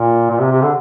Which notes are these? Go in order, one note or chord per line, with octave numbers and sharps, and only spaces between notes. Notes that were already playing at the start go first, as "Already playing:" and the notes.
Already playing: A#2
A#2
C3
C3
D3